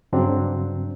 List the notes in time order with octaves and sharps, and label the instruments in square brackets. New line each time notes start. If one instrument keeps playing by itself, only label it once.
[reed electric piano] G2 C#3 F#3 C4 D4